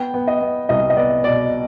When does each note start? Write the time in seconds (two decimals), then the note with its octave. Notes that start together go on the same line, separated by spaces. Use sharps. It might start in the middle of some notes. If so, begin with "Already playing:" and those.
Already playing: B3 G5
0.14 B3
0.28 D#5
0.41 B3
0.69 C2 D#5
0.90 D#5
0.97 B3 D5
1.24 B2 D5